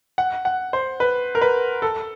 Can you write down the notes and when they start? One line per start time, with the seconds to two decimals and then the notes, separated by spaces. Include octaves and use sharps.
0.18 F#5
0.45 F#5
0.73 C5
1.00 B4
1.35 A#4
1.41 B4
1.82 A4